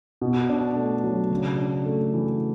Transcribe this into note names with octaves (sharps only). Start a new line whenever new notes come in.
B2
D4
A3
F#3
C#3
D4
A3
E3